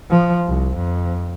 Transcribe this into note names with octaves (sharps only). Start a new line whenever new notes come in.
F3
C2
F2